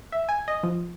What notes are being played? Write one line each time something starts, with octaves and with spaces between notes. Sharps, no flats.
E5
G#5
D#5
F3